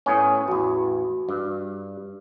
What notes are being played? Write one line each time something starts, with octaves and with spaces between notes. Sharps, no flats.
A2 B3 C#4 G#5 D#6
A1 E2 F#4
G2